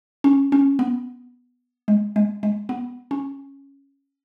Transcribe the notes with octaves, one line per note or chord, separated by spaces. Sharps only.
C#4
C#4
B3
G#3
G#3
G#3
B3
C#4